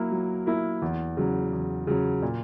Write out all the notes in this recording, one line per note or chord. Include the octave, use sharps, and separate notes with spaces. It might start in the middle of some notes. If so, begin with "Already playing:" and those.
Already playing: F#3 A#3 E4 A#4
F#3
A#3 E4 A#4
E2
C#3 F#3
E2
C#3 F#3
A#2